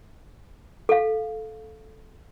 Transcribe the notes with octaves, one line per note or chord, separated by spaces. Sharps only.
A4 F5